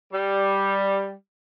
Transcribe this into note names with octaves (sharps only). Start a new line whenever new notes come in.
G3